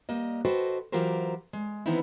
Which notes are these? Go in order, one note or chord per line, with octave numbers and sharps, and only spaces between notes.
G3 A#3 D#5
F#4 A4 B4 C5 D#5 G5
E3 F#3 F4 G4 A#4 C5
G#3
D#3 E3 B3 C4 D#4 E4